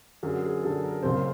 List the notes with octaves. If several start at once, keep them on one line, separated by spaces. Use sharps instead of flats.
F#2 D3 F#3 G#4
G#4
F#2 D3 F#3 A4
A#4
F#1 F#2 C#3 C5